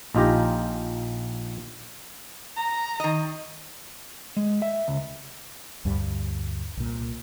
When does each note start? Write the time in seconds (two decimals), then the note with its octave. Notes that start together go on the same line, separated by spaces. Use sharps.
0.15 A#1 D#4 F4 G4 A#5
2.56 A#5
3.00 D#3 D#5
4.37 G#3
4.62 E5
4.88 C#2
5.85 D2 G2 G3
6.77 C2 A#2